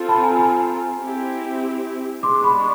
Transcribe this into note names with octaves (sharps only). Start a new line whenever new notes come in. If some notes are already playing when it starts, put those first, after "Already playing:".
Already playing: C4 F4 A4
A5 B5
G#5 A#5
G#5 A#5
C4 E4 G4
G#3 B3 D4 C6 D6
B5 C#6